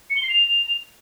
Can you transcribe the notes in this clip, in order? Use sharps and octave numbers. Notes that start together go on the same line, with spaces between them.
C#7
G7
C7
F7